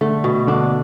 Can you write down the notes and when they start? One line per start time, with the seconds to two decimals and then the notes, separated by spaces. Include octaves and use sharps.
0.01 D3 A3
0.24 B2
0.47 D3 D4